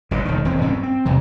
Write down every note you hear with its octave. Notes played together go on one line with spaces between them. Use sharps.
G1 A#2 D3
E1 D#3
E1 E3 C4
G2 C4 C#4
C4
F1 E2 C3 E3